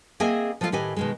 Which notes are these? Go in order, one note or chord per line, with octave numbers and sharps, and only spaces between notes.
A#3 C4 G#4 D#5 E5 G#5
F3 G#3 A3 D#4 F4
A2 D#3 G4 B4 D#5 G#5
B2 D#3 G#3